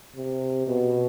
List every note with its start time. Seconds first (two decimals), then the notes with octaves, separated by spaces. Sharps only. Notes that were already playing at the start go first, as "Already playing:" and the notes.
0.15 C3
0.67 B2